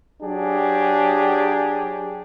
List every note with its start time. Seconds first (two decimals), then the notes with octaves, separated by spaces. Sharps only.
0.23 F#3 D4 G4 G#4